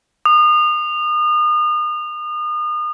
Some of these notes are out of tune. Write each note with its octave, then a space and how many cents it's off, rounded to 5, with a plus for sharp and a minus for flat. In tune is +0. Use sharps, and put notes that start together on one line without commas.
D#6 -35